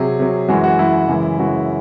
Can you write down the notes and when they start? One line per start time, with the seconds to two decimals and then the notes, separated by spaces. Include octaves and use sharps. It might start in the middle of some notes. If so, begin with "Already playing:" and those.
Already playing: C3 F#3 G#4
0.19 C3 F#3
0.49 F#2 E3 G#3 F#4
0.64 F#4
0.79 F#2 E3 G#3 E4
1.08 F#2 C#3 E3 G#3
1.39 F#2 C#3 E3 G#3 F#4